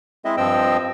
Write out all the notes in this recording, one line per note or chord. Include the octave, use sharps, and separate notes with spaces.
G#3 C4 E4 D#5 E5
G2 F3 C4 D#5 G5 E6